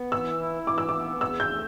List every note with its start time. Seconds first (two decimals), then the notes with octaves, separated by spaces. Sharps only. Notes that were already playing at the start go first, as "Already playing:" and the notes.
Already playing: B3
0.12 E3 E6
0.39 E4
0.67 E3 D6
0.78 E6
0.89 B3 D6
1.21 E2 E6
1.40 G6
1.49 A3